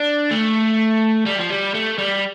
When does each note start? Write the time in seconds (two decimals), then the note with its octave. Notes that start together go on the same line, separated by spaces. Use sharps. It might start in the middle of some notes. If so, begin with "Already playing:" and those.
Already playing: D4
0.31 A3
1.26 G3
1.39 F3
1.50 G3
1.74 A3
1.98 G3